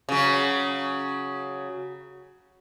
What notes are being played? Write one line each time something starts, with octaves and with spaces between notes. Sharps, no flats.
C#3 F#3